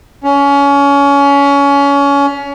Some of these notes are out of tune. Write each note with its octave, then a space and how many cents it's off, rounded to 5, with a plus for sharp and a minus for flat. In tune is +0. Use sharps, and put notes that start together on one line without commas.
C#4 +25